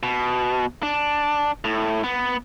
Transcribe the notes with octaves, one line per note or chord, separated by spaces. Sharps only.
B2
D4
A2
B3